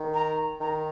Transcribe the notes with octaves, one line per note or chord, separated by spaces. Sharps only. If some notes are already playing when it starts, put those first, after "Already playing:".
Already playing: D#3
A#5
D#3 A#5